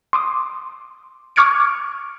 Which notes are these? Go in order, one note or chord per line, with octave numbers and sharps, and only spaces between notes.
C6 D6 D#6
C#6 D6 F6 G#6 C#7 D7